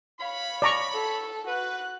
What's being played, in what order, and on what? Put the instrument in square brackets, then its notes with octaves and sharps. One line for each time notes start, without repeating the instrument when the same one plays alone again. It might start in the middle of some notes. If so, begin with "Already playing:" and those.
[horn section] C#5 B5 [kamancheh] F5
[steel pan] D5 A#5 C#6
[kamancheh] A4
[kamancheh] F#4 F#6 [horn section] B4